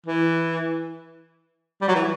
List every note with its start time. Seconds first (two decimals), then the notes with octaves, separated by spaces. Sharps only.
0.07 E3
1.82 G3
1.88 F#3
1.95 E3